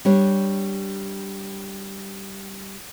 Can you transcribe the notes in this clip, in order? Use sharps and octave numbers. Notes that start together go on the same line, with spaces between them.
G3 D4 C#5